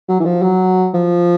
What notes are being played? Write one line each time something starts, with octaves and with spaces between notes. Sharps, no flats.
F#3
E3
F3
F#3
F3